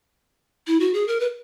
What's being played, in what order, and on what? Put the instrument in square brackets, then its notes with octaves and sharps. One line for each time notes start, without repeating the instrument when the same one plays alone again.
[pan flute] E4
F#4
G#4
A#4
B4